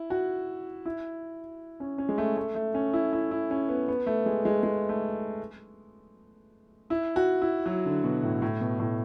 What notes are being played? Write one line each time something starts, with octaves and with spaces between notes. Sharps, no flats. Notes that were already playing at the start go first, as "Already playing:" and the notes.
Already playing: E4
F#4
E4
C#4
C#4
G#3
A3
A3
A3
C#4
E4
E4
E4
C#4
B3
B3
A3
G#3
G#3
G#3
A3
E4
F#4
E4
F#3
D3
B2
A2
A2
B2
A2